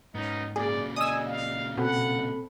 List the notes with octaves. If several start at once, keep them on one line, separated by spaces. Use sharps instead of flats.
G#2 B3 C#4 D#4
A#2 C#3 G#4 D5
D5 D#5 G#5 D#6 E6
F5
B2 C4 A4 F#5 B5